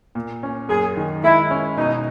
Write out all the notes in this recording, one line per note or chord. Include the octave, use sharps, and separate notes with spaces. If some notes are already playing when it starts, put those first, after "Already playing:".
A#2
C#4
F#2 G#4
D#3
G#3 E4
C#4
B2 D#4